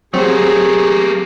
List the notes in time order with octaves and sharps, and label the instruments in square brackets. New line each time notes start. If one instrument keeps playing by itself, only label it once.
[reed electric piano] F#3 C4 [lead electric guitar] A3 A#3 [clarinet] G4 [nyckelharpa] G#4